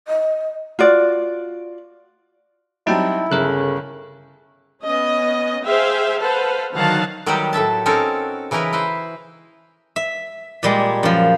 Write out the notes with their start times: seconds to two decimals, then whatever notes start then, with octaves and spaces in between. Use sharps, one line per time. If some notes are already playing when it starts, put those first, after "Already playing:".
0.08 D#5
0.79 F4 F#4 D5
2.87 F#3 G3 C4 D#4 E4 G5 A5
3.32 G1 C#3 A4 A#4 F#6
4.83 B3 C#4 D#5
5.64 G#4 C5 E5 F5 G5
6.20 A4 B4 C5 F5 F#5
6.74 D3 D#3 F#3 F5 F#5 A5
7.26 D#3 F#3 G3 B3 F#4 G4
7.53 A2 A4 E5 A5
7.86 C4 C#4 D#4 F#4 A4 A#4
8.51 C#3 E3 D#4 E4 A#4 B4
8.73 E4 B4 C5
9.96 E5
10.63 A#2 G3 G#3
11.03 F#2 F3